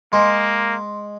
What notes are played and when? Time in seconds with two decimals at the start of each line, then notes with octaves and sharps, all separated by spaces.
0.13 G#3 A#3 C6